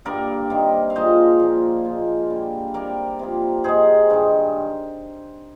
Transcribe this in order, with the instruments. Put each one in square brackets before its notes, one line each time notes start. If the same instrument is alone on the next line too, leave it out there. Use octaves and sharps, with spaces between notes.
[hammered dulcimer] G2 D3 G3 A#3 A#4 D5
C3 D#3 G3 A#3
F5
A#2 F3 G#3 C5 D#5
A#2 F3 A#3
A#2 G#3
D3 G3 A#3
C3 G3 A#3 A#4 D5
C3 F3 A#3
G#2 D#3 G#3 G#4 C5
G2 D#3 G#3